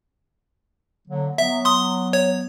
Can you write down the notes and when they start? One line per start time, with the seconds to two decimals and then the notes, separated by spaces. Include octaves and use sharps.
1.08 D3 F#3 A#3
1.38 F#3 B3 E5
1.65 C6 D#6
2.13 C#5